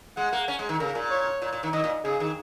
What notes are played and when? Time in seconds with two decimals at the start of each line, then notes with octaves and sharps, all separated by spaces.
0.17 G#3 F#5
0.32 A#3
0.48 C#4
0.59 G#3
0.69 D#3
0.80 C#3 A#4
0.95 A#2
1.10 C#5
1.42 A#2
1.53 A#2
1.63 D#3
1.73 D#3 D#5
1.84 A#2
2.05 C#3 G#4
2.20 D#3